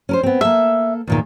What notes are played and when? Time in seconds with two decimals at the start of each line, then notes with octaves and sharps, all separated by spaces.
0.09 C#4 A#4 C5
0.23 B3 C4
0.41 A#3 A4 E5
1.07 E2 A#2 D#3